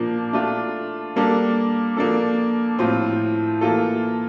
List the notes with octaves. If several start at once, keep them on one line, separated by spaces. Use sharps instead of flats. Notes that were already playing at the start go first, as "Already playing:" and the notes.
Already playing: A#2 F3 A#3 D4
A3 D4 F4
G3 A#3 D4 A4
F3 A#3 D4 A4
A2 F3 C4 F4
E3 A#3 F4 A4